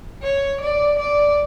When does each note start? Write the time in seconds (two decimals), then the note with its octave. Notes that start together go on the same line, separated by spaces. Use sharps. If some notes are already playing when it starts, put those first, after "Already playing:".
0.23 C#5
0.61 D5
0.99 D5